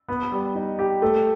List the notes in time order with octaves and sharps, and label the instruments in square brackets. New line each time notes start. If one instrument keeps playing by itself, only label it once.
[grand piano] B3
G3
D#4
G4
A3